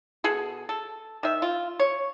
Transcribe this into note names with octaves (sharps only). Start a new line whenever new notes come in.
B2 G#4 A4
A4
D#3 E5
F4
C#5